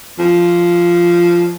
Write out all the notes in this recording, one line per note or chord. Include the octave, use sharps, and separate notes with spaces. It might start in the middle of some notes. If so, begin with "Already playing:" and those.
F3